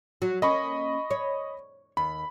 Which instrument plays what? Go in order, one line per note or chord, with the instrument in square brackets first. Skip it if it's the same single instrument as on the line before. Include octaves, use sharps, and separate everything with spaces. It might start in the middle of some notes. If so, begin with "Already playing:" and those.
[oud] F#3
[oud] A#3 C#4 [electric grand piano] D#5 B5 C#6
[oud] C#5
[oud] D#2 [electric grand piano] B5